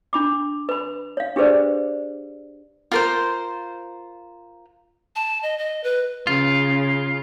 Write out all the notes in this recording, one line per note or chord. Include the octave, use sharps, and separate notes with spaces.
D4 B5 D6
B4 B5
C#5 F5
D4 G4 G#4 B4 C5 D5
F4 A#4 C5
A5
D#5
D#5
B4
C#3 F4